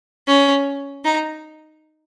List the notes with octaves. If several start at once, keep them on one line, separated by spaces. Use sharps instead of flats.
C#4
D#4